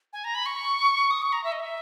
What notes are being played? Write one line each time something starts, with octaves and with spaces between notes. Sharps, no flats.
G#5
A#5
B5
C#6
D#6
C#6
A#5
E5
D#5
E5